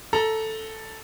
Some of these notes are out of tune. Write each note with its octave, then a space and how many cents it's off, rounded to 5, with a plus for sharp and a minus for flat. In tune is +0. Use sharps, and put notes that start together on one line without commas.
A4 +0 A#5 +15